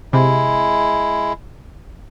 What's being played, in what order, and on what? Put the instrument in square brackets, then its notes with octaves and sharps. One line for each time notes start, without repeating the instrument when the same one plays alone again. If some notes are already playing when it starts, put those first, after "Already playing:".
[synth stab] C3 [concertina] G#3 E4